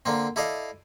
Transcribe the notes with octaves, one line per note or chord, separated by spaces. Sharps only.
D3 A#3 C4
E4 A4 D5 D#5 F5